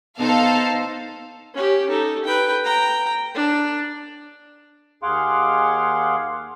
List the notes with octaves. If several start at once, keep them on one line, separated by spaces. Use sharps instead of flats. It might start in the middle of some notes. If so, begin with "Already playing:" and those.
B3 D#4 A4 C5 F5
C#4 G4
D#4 A4
B4 G5
G5 A#5
D4
D#2 G#4 F5 F#5 C6 D6